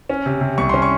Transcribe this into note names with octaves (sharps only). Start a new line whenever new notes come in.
C#4
C3
C3
C2 C#6
C#4 C6
C#6